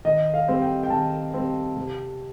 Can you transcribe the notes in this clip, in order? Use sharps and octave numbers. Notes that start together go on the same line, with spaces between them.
D#3 D#5
F5
G3 C4
G5
G5
D#3 A5
G3 C4
C3